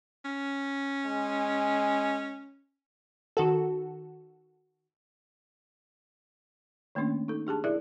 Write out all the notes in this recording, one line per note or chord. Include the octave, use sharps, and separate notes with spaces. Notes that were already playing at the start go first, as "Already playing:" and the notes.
C#4
G#3
D#3 F#4 A4
D#3 A3 A#3 C#4 D4
D#4 A4
D4 G4 G#4 A5
E4 G#4 A#4 D5 E5